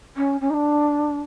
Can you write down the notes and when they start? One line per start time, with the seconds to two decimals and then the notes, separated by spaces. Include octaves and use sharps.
0.16 C#4
0.41 C#4
0.50 D#4
0.53 D4